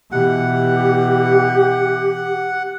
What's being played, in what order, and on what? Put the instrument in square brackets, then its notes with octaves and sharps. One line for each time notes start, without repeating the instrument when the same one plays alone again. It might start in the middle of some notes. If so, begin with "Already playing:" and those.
[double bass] B2 E3 [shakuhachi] G4 [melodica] F#5